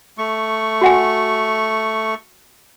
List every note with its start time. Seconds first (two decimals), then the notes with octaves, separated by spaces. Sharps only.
0.18 A3 C#6
0.81 F#4 F#5 G#5